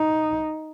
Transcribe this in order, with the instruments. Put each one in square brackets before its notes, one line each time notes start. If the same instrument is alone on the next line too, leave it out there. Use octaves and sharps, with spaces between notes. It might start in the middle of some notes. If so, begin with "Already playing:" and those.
Already playing: [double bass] D#4